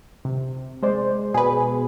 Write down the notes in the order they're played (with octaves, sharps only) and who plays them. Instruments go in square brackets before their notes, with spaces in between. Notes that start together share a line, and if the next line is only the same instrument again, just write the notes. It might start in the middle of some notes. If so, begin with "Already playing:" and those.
[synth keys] C3
G#3 C5 D5
[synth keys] B2 [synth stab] G#4 B4